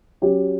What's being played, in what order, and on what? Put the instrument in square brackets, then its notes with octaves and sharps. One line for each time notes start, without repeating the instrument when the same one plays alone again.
[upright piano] F#3 C#4 G4